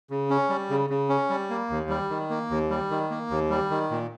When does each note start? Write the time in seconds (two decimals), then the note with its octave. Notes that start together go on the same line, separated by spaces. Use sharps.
0.10 C#3
0.30 C#4
0.49 G3
0.70 C#3
0.90 C#3
1.09 C#4
1.30 G3
1.50 A#3
1.70 D#2
1.89 G3
2.10 D#3
2.30 A#3
2.51 D#2
2.70 G3
2.90 D#3
3.11 A#3
3.30 D#2
3.50 G3
3.71 D#3
3.91 A#2